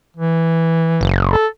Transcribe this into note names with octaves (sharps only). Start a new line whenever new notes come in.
E3
F#1
A4